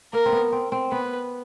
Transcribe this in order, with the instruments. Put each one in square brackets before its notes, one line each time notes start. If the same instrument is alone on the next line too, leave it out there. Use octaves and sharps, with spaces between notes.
[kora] A#3 [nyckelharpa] A#4
[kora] C4
B3
C4
C4
[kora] B3 [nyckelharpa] B4